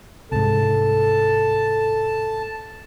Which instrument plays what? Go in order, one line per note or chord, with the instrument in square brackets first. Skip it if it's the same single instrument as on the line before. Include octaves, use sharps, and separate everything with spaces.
[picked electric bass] C2 G#2 [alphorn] A4 [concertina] A5